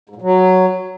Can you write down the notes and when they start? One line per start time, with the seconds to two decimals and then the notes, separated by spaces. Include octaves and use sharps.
0.09 G#2
0.16 A#2
0.22 F#3